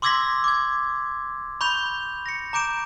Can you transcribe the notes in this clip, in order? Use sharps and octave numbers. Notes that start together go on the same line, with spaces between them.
C6 D6 E6 G#6 A#6 B6
D6 G#6
B5 C#6 G6 F7
A#6 C#7
A#5 D6 G6 D7 E7